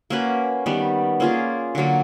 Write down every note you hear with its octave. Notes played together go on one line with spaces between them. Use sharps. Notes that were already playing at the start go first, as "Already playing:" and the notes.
A#3 C#4 F#4 B4
D#3 G3 B3
A#3 C#4 F4 G#4
D3 F#3 A#3